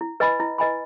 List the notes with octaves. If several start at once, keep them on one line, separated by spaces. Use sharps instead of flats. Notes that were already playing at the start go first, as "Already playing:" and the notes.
E4
B4 D#5 G#5 B5
E4
B4 D#5 G#5 B5